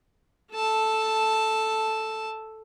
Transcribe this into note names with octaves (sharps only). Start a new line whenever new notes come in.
A4 A5